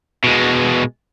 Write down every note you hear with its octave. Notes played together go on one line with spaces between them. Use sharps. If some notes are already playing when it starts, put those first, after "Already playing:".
B2 G#3